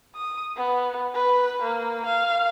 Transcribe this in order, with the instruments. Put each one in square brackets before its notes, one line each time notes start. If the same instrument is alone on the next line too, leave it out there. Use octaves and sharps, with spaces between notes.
[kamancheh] D#6
B3
B4
A#3
F5